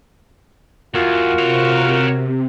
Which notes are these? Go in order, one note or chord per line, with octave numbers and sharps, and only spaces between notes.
E2 F4 F#4 A#4
C3 C#5 F5